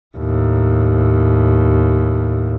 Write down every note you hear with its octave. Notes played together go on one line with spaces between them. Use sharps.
D#2 A2